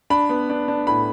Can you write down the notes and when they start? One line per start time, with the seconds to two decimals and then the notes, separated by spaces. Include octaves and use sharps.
0.10 D4 B5
0.29 B3
0.50 D4
0.68 D4
0.87 A2 B5